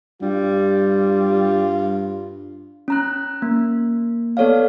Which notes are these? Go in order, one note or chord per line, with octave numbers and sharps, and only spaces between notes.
G2 G3 F4
C#4 A#5 F#6
A#3
B3 A4 C#5 D5 F5